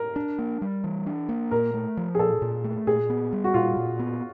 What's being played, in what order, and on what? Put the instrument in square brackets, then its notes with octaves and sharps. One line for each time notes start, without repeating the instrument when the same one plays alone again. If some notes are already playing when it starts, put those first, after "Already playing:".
Already playing: [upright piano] A#4
[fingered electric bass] D4
A#3
G3
E3
D4
A#3
[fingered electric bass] A#2 [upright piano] A#4
[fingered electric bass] A3
F3
[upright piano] G#4
[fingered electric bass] A#2 [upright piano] A4
[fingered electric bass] A#2
A3
[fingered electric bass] A#2 [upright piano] G#4
[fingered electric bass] B3
G3
[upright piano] F#4
[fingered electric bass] A#2 [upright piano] F4
[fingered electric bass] A#2
B3